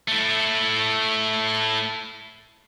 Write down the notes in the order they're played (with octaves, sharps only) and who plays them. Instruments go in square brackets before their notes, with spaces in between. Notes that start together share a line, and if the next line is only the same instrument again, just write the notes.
[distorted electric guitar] A3 E4